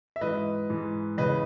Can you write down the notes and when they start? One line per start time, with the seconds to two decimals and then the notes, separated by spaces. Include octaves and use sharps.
0.16 E5
0.21 G#2 E3 B4 D#5
0.70 G#2 E3
1.17 E2 C#3 E3 B4 D#5